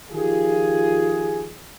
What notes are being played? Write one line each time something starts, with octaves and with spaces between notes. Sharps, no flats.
D#3 F3 F4 G4 G#4